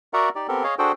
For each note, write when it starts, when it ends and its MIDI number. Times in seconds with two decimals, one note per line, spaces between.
0.13 0.29 66
0.13 0.29 70
0.13 0.29 74
0.13 0.29 76
0.13 0.29 78
0.13 0.29 82
0.35 0.47 63
0.35 0.47 67
0.35 0.47 74
0.48 0.64 59
0.48 0.64 60
0.48 0.64 67
0.48 0.64 69
0.48 0.64 70
0.64 0.75 68
0.64 0.75 73
0.64 0.75 75
0.64 0.75 77
0.79 0.92 62
0.79 0.92 66
0.79 0.92 68
0.79 0.92 69
0.79 0.92 72
0.79 0.92 79